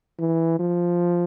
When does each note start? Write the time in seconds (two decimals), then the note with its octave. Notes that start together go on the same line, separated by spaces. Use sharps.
0.19 E3
0.59 F3